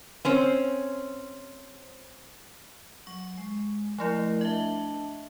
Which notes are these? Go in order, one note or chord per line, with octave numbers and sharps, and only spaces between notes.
C4 C#4 C5
F#3 C#6
G#3
F3 A3 E4 A#4 D#5
D4 D#5 E5 A5